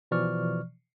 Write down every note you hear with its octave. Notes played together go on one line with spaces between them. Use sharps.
B2 E3 F3 D5 C#6 F6